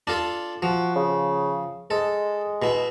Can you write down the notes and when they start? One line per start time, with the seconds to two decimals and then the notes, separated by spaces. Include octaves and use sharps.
0.07 D4 F4 A4
0.62 F3 F#4
0.96 C#3
1.91 G#3 A4
2.62 B2 E4